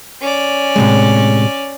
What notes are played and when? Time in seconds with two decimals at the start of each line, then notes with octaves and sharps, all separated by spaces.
0.21 C#4 D5
0.76 A2 C3 G#3